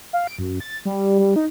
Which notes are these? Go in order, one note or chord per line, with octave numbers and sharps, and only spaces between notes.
F5
D7
F#2
A6
G3
G3
D#4